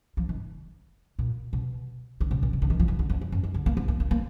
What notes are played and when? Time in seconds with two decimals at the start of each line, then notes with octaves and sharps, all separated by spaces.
0.17 F3
0.29 D#3
1.19 A#2
1.53 B2
2.21 D3
2.31 B2
2.43 A#2
2.53 B2
2.62 D3
2.70 D#3
2.80 F3
2.88 D#3
2.99 D3
3.10 F2
3.21 F#2
3.32 F#2
3.43 D#3
3.54 D3
3.66 A#3
3.77 B3
3.88 A#3
4.00 A#3
4.11 A#3